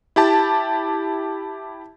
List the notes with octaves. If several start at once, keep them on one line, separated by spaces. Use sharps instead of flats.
E4 G4 A5